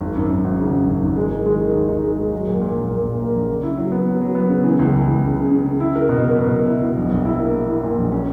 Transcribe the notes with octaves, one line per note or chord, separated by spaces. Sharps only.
G#1
F#2
F#2
G#1
C#3
G#1
G#1
G#1
G#3
D#3
G#3
D#3
D#2
D#4
G#3
G#3
F#3
A#2
A#2
A#1
A#2
A#2
A#3
A#1
C#3
E4
F#3
B3
F#3
F#3
B3
C#3
E3
C#2
E3
C#2
C#3
C#3
C#3
C#3
E4
A#4
B2
A#4
B2
A#4
E4
B2
A#1
A#1
E4
A#3
E4
E4
A#2
A#1
C#4